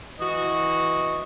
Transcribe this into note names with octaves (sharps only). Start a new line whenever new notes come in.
E3 F#4 D#5